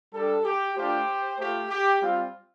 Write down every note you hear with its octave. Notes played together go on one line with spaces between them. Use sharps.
G3 D4 G4 A4
G4
A3 D4 F4 G4 C5
A3 F4 G4
G4
G3 C4 F4